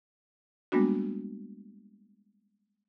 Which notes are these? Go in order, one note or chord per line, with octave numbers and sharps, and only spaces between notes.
G3 G#3 A#3 B3 D4 F#4